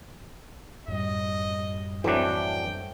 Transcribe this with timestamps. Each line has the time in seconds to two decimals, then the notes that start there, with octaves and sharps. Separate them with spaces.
0.88 F#2 A2 G3 D#5
2.04 E3 F#3 A3 C4 D4 G5